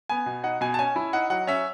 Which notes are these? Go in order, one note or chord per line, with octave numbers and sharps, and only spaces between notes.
B3 G#5
B2
D#4 F#5
B2 G#5
A5
C#4 G#5
E4
D#4 F#5
F#3 F#5
C#4 E5